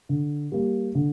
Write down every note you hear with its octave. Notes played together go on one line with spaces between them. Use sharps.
D3
G3 A#3
D3